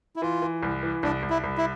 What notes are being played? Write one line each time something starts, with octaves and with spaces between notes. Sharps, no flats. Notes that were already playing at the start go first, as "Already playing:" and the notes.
E4
E3 F4
E3
C2
E3
C2 D4
C2
E4
C2
E4